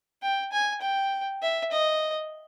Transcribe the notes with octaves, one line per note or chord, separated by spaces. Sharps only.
G5
G#5
G5
E5
D#5